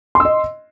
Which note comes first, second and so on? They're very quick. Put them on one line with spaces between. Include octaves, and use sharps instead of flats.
C6 E6 D#5